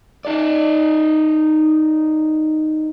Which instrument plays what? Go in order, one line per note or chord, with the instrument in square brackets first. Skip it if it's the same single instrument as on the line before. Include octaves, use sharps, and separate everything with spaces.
[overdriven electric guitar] D#4 D5